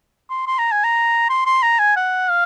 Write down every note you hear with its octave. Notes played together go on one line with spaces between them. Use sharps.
C6
C6
A#5
G#5
A#5
C6
C6
A#5
G#5
F#5
F5